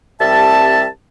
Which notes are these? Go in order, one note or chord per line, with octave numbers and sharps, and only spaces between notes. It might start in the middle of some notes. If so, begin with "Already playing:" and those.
C2 G3 C4 E5 A5